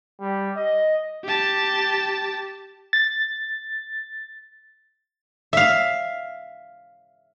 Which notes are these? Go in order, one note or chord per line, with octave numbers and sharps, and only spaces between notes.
G3
D#5
G4 A5
A6
E5 F5